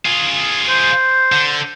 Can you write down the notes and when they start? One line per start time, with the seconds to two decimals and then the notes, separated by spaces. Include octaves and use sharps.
0.06 F4 G#4
0.69 C5
1.32 D3